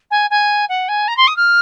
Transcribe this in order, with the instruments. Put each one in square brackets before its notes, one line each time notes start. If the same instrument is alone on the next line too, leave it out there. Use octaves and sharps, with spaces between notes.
[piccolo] G#5
G#5
F#5
G#5
A#5
C6
D#6
F6